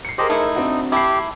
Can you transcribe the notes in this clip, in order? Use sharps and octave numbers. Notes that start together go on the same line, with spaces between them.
C7 C#7
G4 G#4 A#4 C5 D#5
A3 D#4 E4
C4 D4 F#4
E4 G4 A5 B5 C7